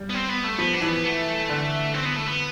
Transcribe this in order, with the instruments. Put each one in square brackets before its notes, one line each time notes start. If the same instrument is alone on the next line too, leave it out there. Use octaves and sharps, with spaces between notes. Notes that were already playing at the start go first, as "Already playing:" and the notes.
Already playing: [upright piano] G3
[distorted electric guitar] B3
C4
B3
A3
[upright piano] F3 [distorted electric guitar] B3
[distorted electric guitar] D4
[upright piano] E3
[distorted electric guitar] B3
A3
[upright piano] D3
[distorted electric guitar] C4
B3
A3
B3